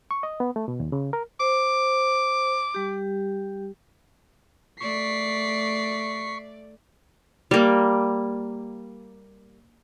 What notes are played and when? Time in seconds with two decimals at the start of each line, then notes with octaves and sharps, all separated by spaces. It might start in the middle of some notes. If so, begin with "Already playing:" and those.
0.11 C#6
0.23 D#5
0.40 B3
0.56 A3
0.68 B2
0.80 D#2
0.92 C#3
1.13 A#4
1.40 C5 D6
2.74 G3 G4
4.81 A3 D5 C#6 B6 C7
7.51 G3 A#3